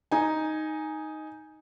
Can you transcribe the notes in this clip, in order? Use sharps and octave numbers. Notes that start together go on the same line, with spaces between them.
D#4 G#5